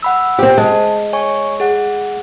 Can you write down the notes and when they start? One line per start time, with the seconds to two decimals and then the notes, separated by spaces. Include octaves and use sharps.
0.03 F#5 B5 E6
0.38 C4 G4 C5
0.58 G#3 A5
1.13 C#5 G#5 C#6
1.60 G#4 F#5